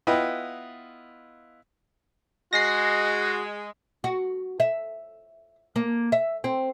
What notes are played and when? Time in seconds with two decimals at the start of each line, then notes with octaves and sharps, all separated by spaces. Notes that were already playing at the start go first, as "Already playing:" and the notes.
0.07 B3 E4 F4 B4 D#5 G5
2.53 G#3 F#4 A#6 C7
4.04 F#4
4.60 E5
5.76 A#3
6.12 E5
6.44 C4